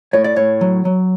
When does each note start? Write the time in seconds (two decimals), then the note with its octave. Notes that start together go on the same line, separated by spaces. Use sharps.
0.13 A2 C#5
0.24 D5
0.36 A2 C#5
0.61 F#3
0.85 F#3